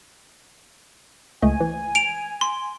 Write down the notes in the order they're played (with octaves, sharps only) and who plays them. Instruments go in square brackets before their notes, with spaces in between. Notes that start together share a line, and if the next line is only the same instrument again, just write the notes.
[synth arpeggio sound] C#2 A3 D#5 [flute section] G#5
[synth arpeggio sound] E3
[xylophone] D7 F7
C6